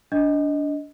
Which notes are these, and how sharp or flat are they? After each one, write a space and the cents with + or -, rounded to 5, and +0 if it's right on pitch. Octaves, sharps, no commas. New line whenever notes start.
D4 -20 D#5 +5